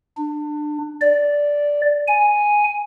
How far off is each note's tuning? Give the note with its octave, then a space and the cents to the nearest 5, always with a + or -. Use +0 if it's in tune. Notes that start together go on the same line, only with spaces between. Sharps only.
D4 +25
D5 -10
G#5 +0